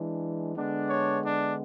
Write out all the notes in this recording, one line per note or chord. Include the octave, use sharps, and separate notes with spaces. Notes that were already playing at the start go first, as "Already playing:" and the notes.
Already playing: E3 G#3 D4
D3 G#3 B3 D4
C#5
D4